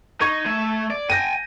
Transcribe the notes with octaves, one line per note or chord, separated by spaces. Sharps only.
D#4 C#6 G#6 D#7
A3 E5
D5
G5 G#5 G6 A#6 D#7